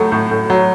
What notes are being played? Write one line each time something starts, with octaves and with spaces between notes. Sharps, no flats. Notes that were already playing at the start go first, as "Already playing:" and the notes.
Already playing: A2 F#3 A3
A2
A2
F#3